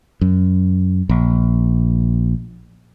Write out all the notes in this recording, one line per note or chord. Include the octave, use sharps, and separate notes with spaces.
F#2
A#1